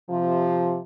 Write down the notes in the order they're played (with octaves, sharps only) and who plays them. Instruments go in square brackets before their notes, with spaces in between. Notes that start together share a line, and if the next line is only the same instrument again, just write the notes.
[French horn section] C3 F3